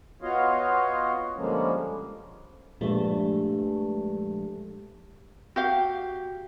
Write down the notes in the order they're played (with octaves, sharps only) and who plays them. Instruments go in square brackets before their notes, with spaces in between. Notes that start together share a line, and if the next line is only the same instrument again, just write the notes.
[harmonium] B3 F4 F#4 C#5 D#5 F5
D3 F3 G3 G#3 A#3 C#4
[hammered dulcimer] G2 A3 [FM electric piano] A#2 F3 G#3
[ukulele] F#4 G4 F5